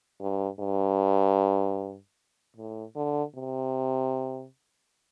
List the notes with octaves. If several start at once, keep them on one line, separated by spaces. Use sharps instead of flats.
G2
G2
A2
D3
C3